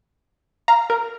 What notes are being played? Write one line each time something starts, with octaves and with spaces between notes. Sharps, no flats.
F5 A#5
A#4